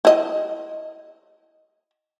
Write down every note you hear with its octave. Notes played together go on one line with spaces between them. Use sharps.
E4 D#5